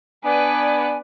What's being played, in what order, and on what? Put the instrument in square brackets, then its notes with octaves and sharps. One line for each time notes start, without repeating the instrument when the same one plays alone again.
[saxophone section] B3 D4 [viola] B4 D5 [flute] G#5